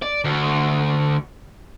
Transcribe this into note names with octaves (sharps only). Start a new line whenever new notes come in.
D5
D2